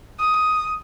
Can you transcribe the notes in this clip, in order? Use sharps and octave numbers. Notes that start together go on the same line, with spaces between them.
D#6